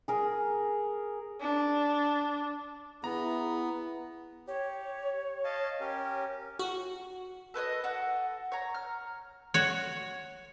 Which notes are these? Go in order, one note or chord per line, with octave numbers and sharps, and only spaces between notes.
G#4 A#4
D4
B3 E4 G#4 A#5
G4 C#5
D#5 F5 A5
C#4 G4 A#4
F#4
A4 B4 C#5 D#5
F#4 A4 F#5
C#5 A#5
F6
F#4 C#5